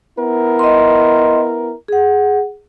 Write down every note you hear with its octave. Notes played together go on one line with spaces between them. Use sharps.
B3 E4 A#4
D#5 C6
G#4 F#5